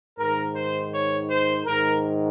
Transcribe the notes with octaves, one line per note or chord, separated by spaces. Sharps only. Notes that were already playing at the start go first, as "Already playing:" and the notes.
G#2 D#3 A#4
C5
C#5
C5
G#2 D#3 A#4